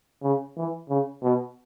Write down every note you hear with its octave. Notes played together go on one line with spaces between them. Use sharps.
C#3
E3
C#3
B2